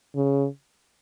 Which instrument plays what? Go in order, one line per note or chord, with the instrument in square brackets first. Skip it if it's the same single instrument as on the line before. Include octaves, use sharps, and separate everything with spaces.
[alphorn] C#3